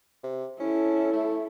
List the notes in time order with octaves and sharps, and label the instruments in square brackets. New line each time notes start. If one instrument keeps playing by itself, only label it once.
[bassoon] C3
[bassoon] C#4 [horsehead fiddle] E4 A4
[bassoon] A3